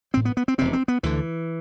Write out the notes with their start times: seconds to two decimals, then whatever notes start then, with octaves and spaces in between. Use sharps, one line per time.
0.14 A1 A2 C4
0.25 B3
0.37 B3
0.48 C4
0.58 F1 E2 C3 C4
0.73 C4
0.88 B3
1.03 D2 D3 E3